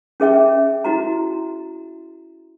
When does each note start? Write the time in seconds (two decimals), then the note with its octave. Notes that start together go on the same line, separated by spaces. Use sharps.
0.20 C#4 G#4 E5 G5
0.84 E4 F#4 A#5